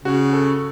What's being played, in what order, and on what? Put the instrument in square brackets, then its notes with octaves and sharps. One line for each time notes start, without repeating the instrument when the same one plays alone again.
[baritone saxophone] C#3 [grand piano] F#4
[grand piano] A4